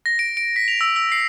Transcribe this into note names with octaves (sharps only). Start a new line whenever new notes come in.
A#6
D7
D7
B6
F7
E6
E6
C7